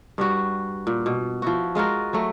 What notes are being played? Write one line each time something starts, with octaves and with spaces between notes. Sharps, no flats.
G2 G3 F#4
A#2
B2
F3 E4 F#4
G#3 F4 F#4 A#4
F#3 A3